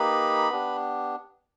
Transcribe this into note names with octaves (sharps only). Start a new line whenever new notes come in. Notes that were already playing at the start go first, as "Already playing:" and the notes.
Already playing: A#3 D#4 G4 B4 B5
B3 D4 G4